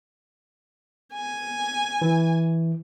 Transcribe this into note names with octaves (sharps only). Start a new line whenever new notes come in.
G#5
E3